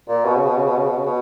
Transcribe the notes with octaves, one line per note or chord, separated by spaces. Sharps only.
A#2
B2
C#3
B2
C#3
B2
C#3
B2
C#3
B2